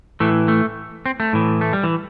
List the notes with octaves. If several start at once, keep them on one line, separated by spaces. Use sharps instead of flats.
A2 E3 A3
A3
C4
A3
A2 E3
A3
G3
E3